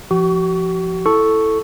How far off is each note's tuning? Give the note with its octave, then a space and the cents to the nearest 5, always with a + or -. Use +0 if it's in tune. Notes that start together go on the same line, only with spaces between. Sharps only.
F3 -20 F#4 +45 C#6 +25
E4 +5 A4 +0 C#6 +0